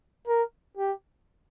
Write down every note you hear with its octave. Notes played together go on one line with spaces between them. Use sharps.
A#4
G4